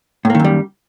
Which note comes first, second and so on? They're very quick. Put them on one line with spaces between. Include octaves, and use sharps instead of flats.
A2 A#3 D#3 F#2 G3